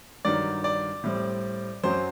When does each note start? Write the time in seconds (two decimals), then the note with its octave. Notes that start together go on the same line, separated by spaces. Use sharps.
0.25 G2 D#3 F#3 D5
0.64 D5
1.04 A2 G3 C4
1.83 F#2 F#3 C4 C5